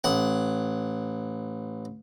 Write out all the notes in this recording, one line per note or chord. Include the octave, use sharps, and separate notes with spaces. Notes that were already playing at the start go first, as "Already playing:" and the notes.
A1 F#5